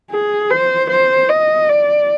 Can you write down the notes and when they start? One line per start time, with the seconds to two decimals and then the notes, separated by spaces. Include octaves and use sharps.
0.11 G#4
0.50 C5
0.90 C5
1.29 D#5
1.69 D5